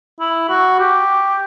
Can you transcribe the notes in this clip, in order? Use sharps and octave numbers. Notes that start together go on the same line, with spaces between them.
E4
F#4
G4